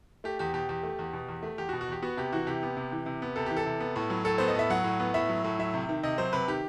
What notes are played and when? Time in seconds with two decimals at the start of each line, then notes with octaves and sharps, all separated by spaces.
0.24 A3 G4
0.39 E2 G4
0.54 B2 G4
0.69 E2 G4
0.83 A3
0.99 E2
1.13 B2
1.28 E2
1.43 A3
1.58 E2 G4
1.69 F#4
1.73 B2
1.81 F#4
1.88 E2 G4
2.02 B3 F#4
2.17 C3 G4
2.32 E3 F#4
2.47 C3 G4
2.63 B3
2.77 C3
2.92 E3
3.06 C3
3.22 B3
3.36 C3 A4
3.46 E3 G4
3.57 A4
3.66 C3
3.80 B3
3.96 A2
4.10 F#3
4.25 A2 A4
4.38 B3 C5
4.48 D#5
4.55 A2 E5
4.70 F#3 F#5
4.84 A2
5.00 B3
5.14 A2 E5
5.29 F#3
5.44 A2
5.59 F#3 E5
5.74 C3
5.89 D#3
6.03 C3 D#5
6.18 F#3 C5
6.33 C3 B4
6.48 D#3 G4